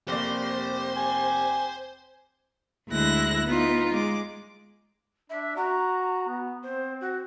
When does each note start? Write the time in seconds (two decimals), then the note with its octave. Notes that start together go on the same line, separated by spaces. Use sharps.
0.08 F1 A#3 G4 C5 D5
0.96 G#5
2.90 D2 G#3 E4 F#6 A#6
3.45 B3 D#4 F4
3.92 G#3 D6
5.30 D4 E5
5.57 F#4 A#5
6.28 B3
6.63 C4 C5
7.01 F#4